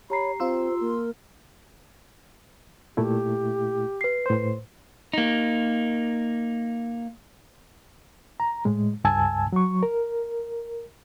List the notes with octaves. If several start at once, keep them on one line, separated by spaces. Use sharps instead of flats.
G4 C#5 A#5 B5 C7
C4 F4 C5 C6 E6
A#3 A#4
A#2 A3 E4 G4
B4 C7
A2 C5
A#3 D#4
A#5
A2 G#3
C#2 G2 G#5 A5 E6 G#6
F#3 C#6
A#4